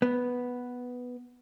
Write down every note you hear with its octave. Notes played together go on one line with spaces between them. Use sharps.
B3